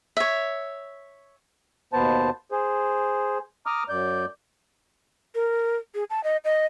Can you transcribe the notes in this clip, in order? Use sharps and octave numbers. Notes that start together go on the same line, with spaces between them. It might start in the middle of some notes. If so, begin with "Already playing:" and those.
C#5 E5
D#2 B2 B3 C5 A5
G#4 C5
A#5 D6 D#6 F6
F#2 D5 G6
A#4
G#4
A5
D#5
D#5